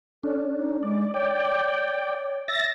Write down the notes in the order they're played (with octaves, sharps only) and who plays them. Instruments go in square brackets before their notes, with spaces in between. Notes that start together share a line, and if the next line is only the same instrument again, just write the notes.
[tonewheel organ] C#4 D4 [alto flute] A4
[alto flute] D#4
[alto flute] G#3 [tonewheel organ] D5
[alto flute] C#5 [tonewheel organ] D5 G5
[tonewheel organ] E5 A6 A#6